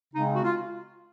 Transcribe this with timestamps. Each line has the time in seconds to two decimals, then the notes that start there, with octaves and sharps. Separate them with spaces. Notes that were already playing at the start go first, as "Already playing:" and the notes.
0.14 C#3 G#3 C4 D#4
0.34 F#4
0.43 F4